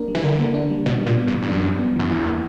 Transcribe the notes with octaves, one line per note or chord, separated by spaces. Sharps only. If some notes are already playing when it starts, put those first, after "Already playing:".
Already playing: A#3 D4 A#4
G3
E3
D3 A#4
A#3
D4
G3
B2 D4
A#2 G3
B3
G2
E3
G2
F#2 D4
G3
B3
F#2 E3
E2 E4
A#3